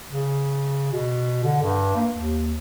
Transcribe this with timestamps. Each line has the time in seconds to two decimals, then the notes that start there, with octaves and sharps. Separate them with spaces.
0.11 C#3
0.92 B2
1.44 D3
1.63 G2
1.96 A#3
2.13 D#2